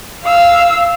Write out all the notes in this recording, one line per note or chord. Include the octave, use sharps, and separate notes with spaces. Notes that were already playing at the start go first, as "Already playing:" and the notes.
F5 E6